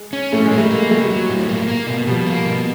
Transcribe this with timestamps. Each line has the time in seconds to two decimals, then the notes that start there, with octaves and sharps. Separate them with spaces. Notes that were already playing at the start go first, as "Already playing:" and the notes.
Already playing: G#3
0.13 C#4
0.32 A2 A3
0.45 G#3
0.51 A#3
0.57 G3 A3
0.71 A#3
0.90 F#3 G3 A3
1.10 F#3
1.29 A2
1.49 A#3
1.68 A#3
1.87 B2
2.07 B2 F3 G3
2.27 A#3
2.46 B2